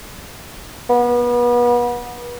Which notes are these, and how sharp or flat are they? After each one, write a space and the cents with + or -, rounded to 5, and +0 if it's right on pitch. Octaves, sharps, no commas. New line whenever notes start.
B3 -30